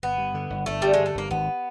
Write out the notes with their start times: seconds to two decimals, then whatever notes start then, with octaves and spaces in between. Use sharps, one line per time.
0.03 G1 B3
0.18 G2
0.34 D3
0.50 G1
0.66 G1 A3
0.82 G2 G3
0.94 G#3
0.99 D3
1.06 A3
1.15 G1 A#3
1.31 G#1 B3